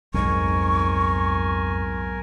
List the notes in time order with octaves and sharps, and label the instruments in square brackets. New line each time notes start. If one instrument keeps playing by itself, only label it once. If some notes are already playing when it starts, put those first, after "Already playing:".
[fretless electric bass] B1 G#2 [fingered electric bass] F2 [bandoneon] A#4 G#5 [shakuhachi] C#6